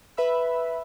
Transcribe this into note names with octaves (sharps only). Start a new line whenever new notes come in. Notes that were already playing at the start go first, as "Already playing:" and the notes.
B4 E5 B5 E6